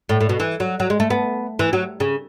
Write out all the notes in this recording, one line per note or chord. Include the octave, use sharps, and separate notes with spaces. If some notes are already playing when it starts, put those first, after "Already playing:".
A2
A2
B2
E3
F#3
F#3
G#3
A3
B3
E3
F#3
C#3